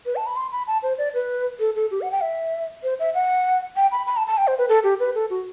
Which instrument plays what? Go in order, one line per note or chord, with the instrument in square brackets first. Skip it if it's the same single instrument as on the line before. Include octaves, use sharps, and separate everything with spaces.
[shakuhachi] B4
A5
B5
C6
B5
A5
C5
D5
B4
A4
A4
G4
F#5
G5
E5
C5
E5
F#5
G5
B5
B5
A5
A5
G5
C5
B4
A4
G4
B4
A4
F#4